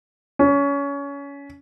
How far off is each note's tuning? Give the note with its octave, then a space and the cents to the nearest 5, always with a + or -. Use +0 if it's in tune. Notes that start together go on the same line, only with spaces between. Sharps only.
C#4 +25